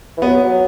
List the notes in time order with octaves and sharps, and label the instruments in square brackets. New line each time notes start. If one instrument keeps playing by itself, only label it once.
[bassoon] E3
[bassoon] F#3 [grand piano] B3
[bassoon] F#3